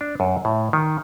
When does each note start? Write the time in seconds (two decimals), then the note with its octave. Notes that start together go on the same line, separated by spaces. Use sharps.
0.01 D4
0.20 F#2
0.45 A2
0.73 D#3